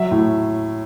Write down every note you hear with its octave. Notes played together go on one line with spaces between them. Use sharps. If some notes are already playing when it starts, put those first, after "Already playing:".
Already playing: F#3 E5
A2